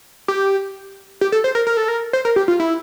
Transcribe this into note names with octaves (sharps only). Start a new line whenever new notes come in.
G4
G4
A4
C5
A#4
A#4
A4
A#4
C5
A#4
G4
F4
E4